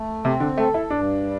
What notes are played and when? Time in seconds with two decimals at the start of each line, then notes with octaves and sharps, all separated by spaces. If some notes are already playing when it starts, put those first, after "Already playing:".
Already playing: A3
0.24 C3 C4
0.40 D3
0.57 A3 A4
0.74 E4
0.90 G2 D4
1.24 G3